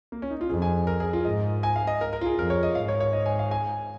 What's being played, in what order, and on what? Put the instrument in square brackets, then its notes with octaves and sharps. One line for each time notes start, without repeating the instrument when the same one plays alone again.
[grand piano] A#3
C#4
D#4
F4
[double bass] F2 [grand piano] G#4
[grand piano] G#5
A#4
G#4
F4
[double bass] G#2 [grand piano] D#5
[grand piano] G#5
F5
D#5
A#4
A#4
F4
G#4
[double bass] F2 [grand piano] A#4
[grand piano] C#5
D#5
[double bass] G#2 [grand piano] F5
[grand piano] C#5
C#5
D#5
G#5
F5
G#5